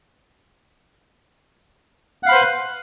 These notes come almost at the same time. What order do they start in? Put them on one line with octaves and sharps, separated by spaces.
F#5 F5 B5 C5 B4